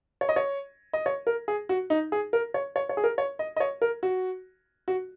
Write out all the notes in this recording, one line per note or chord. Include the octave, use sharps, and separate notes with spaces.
C#5
D#5
C#5
D#5
C#5
A#4
G#4
F#4
D#4
G#4
A#4
C#5
C#5
C#5
G#4
A#4
C#5
D#5
D#5
C#5
A#4
F#4
F#4